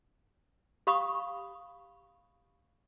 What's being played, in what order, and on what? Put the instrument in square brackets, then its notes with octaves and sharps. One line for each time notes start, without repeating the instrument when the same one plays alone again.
[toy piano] G4 F5 B5 C#6 D#6